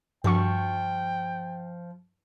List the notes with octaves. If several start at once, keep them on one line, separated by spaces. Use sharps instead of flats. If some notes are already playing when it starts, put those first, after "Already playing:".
G2 F3 F#4 G5 C#6